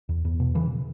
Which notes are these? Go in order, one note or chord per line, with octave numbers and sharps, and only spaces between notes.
E2
E2
B2
C#3 E3